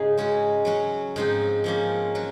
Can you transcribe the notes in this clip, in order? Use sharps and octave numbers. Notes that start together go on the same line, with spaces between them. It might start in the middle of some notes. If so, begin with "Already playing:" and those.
Already playing: G#2 C#3 D#4 G#4 C#5
G#3 C#4 F#4
F#3 C#4 F#4 C#5
G#2 F3 C4 D#4
G#2 F3 A#3 C#4
F#3 F#4